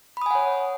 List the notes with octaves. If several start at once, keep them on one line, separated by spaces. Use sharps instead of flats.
C#5 F#5 G#5 B5 D#6